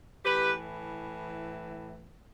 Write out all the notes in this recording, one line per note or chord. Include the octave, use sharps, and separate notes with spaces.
A2 E3 G4 B4